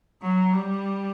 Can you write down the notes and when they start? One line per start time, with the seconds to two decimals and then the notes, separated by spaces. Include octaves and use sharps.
0.22 F#3
0.53 G3